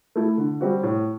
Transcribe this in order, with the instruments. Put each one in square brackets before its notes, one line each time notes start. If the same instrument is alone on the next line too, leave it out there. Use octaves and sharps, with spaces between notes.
[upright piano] A3 E4 A4
D3
G3 C4 F#4
A2